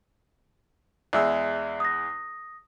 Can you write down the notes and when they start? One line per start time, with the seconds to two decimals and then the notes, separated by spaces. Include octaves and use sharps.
1.13 E2 G#3 D5 E5 E6
1.80 D#6 A#6